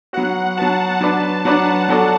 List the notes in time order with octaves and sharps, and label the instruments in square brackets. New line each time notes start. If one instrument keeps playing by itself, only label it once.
[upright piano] F#3 B3 F#4 [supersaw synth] F#5
[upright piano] F#3 B3 F#4 [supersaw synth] A5
[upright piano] F#3 D4 B4 D5
[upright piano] F#3 D4 B4 D5 [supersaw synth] F#5
[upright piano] F#3 B3 F#4 A4 D5